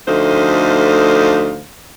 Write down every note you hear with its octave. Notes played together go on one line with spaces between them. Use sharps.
D2 F3 A3 D#4 C5 F5